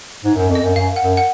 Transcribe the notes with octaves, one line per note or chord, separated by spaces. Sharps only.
G#2
F#2
F2
D#5
F#2
F#2 F5
F#5
F#2
F#5